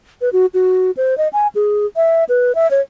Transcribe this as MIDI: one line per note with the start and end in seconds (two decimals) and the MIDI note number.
0.21 0.29 71
0.33 0.46 66
0.54 0.91 66
0.97 1.17 72
1.18 1.28 75
1.33 1.47 80
1.55 1.86 68
1.96 2.24 76
2.29 2.55 71
2.55 2.70 76
2.71 2.81 73